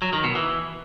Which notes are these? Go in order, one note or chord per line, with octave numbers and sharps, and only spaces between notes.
F#3
D#3
B2
E3